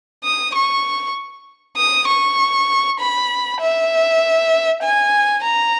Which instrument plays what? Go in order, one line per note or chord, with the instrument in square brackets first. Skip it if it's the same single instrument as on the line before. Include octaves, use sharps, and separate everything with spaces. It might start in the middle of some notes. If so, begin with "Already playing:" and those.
[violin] D#6
C#6
D#6
C#6
B5
E5
G#5
A#5